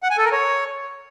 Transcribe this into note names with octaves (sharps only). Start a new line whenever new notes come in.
F#5
G#5
A4
A#4
C#5